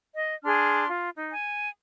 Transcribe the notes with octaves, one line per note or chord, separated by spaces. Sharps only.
D#5
D4 G#4 C6 F6
F4
D#4
G#5